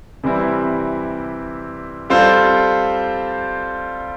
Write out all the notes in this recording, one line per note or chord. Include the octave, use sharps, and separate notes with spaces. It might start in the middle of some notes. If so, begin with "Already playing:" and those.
C3 E3 G3 C4 E4
G3 C4 F4 A4 C5